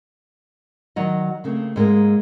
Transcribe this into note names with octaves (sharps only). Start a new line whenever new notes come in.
D#3 F#3 D#5
C#3 A3 A#3 C4
G#2 G#3 A#3 A#4